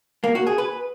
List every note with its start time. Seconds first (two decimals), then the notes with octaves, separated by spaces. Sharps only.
0.24 A#3
0.35 F#4
0.47 G#4
0.58 B4